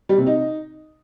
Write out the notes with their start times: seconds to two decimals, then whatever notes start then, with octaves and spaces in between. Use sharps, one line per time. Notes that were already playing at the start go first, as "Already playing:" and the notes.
0.09 G3
0.18 C3
0.26 D#4